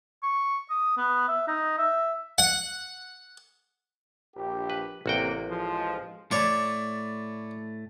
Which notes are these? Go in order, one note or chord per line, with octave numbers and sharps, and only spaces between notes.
C#6
D#6
B3
E5
D#4
E5
F#5
A#1 G4
B4
A1 C3 A#3 F#4 G5
F3 G#3
A2 A3 C#5 D5 C#6